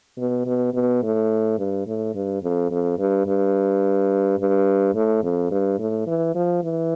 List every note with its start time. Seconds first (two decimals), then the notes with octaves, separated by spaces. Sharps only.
0.18 B2
0.46 B2
0.74 B2
1.03 A2
1.58 G2
1.87 A2
2.15 G2
2.43 F2
2.71 F2
2.99 G2
3.27 G2
4.39 G2
4.95 A2
5.23 F2
5.51 G2
5.79 A2
6.07 E3
6.35 F3
6.63 E3